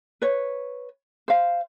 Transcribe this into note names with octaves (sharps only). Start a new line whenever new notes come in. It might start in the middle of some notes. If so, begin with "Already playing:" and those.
B4 C#5
C5 F5